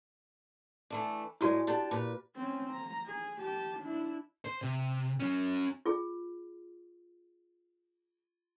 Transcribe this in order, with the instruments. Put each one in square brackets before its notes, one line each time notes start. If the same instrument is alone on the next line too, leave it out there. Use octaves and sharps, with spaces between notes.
[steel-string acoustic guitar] E3 A3 D4
[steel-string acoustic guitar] A2 G#3 [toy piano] E4 F#4 D5
[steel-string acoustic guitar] D4 G4 A5
A#2 B4
[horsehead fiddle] C4 C#4
A#5
G#4
G4 A5
D4 E4
[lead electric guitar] C5
C3
C#4 F#4
[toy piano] F4 G#4